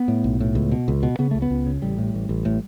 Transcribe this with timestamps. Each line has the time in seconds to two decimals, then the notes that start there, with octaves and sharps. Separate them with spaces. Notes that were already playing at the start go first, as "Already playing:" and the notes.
Already playing: B3
0.08 A2
0.24 B1
0.40 A2
0.55 C#2
0.72 B2
0.88 C#2
1.03 B2
1.19 C#3 B3
1.31 C#2 A3
1.42 B3
1.50 C#2
1.66 C#3
1.82 A1 G3
1.98 A2
2.14 A1
2.29 A1
2.45 A2